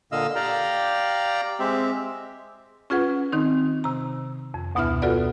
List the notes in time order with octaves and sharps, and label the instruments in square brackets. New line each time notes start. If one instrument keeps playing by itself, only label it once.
[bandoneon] A#2 D3 D#5 F5 E6
G4 D5 F5 G5 A#5
G#3 C4 G4 E5
[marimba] C#4 F4 G#4 B4 F#5
D#3 C4 D#4
C3 A#5
F2
D2 B2 B3 E4 E5 F6
F4 F#4 A4 B4 D5 F#5